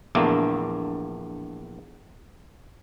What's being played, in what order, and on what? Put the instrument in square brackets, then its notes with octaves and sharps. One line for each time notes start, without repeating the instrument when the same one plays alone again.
[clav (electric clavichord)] A#1 E2 D3 A3 A#3